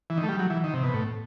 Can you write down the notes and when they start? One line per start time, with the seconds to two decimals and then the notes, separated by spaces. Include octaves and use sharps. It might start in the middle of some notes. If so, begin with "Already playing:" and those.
0.10 E3
0.18 D#3
0.23 A3
0.29 G3
0.39 F#3
0.50 E3
0.64 D#3
0.74 C3
0.84 B2
0.94 A2